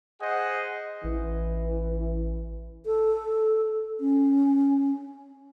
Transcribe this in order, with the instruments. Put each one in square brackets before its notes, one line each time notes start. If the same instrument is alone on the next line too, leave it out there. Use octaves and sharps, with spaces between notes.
[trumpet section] G#4 C5 D#5 F#5
[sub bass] A1 [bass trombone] E3
[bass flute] A4
C#4